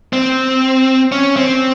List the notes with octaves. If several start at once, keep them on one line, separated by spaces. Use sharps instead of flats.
C4
C#4
C4